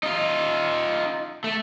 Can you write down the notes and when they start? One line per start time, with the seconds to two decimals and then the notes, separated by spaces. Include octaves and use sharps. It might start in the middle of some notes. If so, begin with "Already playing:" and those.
0.03 D#4 F4
1.44 A3